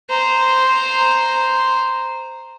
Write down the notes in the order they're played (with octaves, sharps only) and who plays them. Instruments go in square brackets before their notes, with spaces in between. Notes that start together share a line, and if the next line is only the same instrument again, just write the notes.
[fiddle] C5 A#5